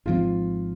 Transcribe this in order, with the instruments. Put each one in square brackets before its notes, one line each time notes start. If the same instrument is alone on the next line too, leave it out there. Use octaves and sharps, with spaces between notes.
[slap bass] G#1 G#2 F3 C4 [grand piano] F4